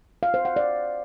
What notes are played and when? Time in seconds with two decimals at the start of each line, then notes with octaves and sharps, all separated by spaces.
0.23 F5
0.34 C5
0.45 F#5
0.56 D5